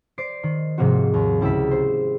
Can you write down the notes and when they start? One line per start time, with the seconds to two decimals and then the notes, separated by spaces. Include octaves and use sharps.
0.18 C5 D5 C7 D7
0.43 D#3
0.78 G#2 C3 F3 A#3 C4 F#4
1.14 D#2
1.41 C#2 E4 G4 E6 B6
1.71 C5